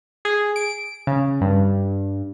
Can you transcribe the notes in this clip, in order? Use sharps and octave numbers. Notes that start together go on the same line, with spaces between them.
G#4
D7
C#3
G2